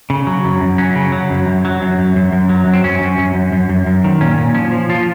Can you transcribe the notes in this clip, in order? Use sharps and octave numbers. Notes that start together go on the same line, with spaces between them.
C#3
F#3
F#2
F#2
F#3 C#4
C#3
F#3
F#2
F#2
F#3
F#2
F#2
F#2
F#2
F#3
F#2
C4
F#2 C#4
F#2
F#2
F#2
F#2
F#2
F#2
D#3
A#2 C#4
A#2
F3 C#4
F3
F3 F4